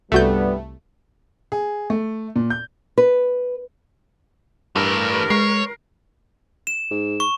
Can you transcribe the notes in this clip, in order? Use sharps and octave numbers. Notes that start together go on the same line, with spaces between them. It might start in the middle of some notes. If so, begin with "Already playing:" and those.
C2 G2 G3 A3 B3 F#4 G6
G#4
A3
A#2
G6
B4
G2 E3 A3 A#4 B4
G#3 C#5 C7
E7
G#2
C#6